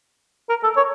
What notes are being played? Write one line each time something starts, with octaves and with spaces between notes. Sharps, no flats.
A#4
A4
C#5